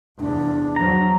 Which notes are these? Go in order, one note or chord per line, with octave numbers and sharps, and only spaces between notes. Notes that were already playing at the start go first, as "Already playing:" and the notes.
F1 E2 D4
E2 F3 F#3 A#5